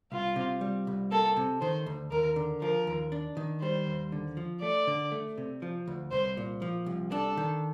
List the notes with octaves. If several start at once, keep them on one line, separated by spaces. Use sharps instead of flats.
C2 F4
C3
G3
C2
A#3 A4
C3
D#3 C5
D2
D#2 A#4
D3
F3 A#4
D#2
D4
D#3
G3 C5
D#2
D3
F3
A3 D5
D3
A3
C3
F3
D2
C2 C5
A#2
F3
C2
D4 A4
D#3